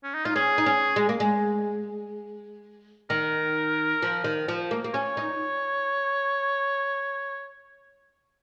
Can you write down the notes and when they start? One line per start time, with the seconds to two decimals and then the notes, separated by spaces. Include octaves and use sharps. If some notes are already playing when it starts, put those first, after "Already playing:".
0.04 C#4
0.14 D#4
0.25 D#4 F4
0.36 C#4 G#4
0.58 D#4
0.66 C#4
0.96 G#3
1.09 A#3
1.20 G#3
3.10 D#3 A#4
4.02 F3
4.24 D#3
4.48 F3
4.71 A#3
4.84 A#3
4.94 C#4 C#5
5.17 D#4